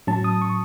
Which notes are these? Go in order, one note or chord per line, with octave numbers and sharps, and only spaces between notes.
A2 F#3 C#4 A5
D#6
C#6